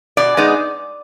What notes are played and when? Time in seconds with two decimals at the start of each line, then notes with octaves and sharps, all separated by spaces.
0.17 B2 D5
0.37 G#3 B3 D#4